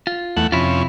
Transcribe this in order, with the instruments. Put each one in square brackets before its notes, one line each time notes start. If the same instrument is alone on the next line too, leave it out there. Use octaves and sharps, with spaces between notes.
[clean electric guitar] F4
[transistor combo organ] E2 A3 F#5
[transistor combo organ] F2 C#4 [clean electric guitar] C3 E4 F4